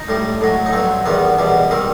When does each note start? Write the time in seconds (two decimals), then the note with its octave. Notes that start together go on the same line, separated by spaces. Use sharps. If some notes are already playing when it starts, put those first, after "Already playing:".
Already playing: D#4
0.09 A2 G3
0.41 A2 F#3
0.66 D#4
0.73 G2 F#3 C4
1.06 E2 D#3 G3 B3
1.38 E2 B2 G3
1.71 D#3 G3 C4